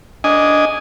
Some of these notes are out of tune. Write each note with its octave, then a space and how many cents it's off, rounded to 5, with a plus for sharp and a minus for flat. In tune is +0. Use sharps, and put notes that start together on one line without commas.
D4 -20 D#5 +0 G#5 +0